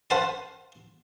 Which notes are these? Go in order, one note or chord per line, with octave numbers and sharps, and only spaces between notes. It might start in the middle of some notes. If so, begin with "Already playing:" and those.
C5 F5 F#5 A5 B5